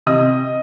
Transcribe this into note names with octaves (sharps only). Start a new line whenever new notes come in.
C3 D#5 D#6